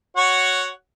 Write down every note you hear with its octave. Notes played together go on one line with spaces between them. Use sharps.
F#4 C#5 F#5